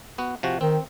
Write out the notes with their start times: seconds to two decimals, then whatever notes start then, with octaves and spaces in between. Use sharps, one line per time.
0.18 B3 F#4
0.43 C3 F3 F#4
0.61 D#3 C4